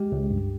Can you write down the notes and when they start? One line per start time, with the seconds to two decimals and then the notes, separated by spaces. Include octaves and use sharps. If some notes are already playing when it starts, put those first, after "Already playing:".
Already playing: G#3 G4
0.12 C#2
0.31 G2